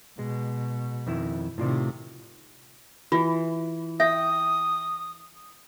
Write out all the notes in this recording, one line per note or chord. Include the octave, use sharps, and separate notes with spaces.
B2 G#3
F2 D#3 E4
A2 C3 D#3 F4 D5
E3 F4
E5 G5 D#6